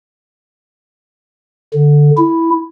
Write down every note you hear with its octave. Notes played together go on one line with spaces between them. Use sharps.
D3
E4